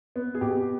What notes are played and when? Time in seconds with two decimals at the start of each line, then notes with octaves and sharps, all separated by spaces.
0.16 B3
0.35 G#4
0.41 B2 G4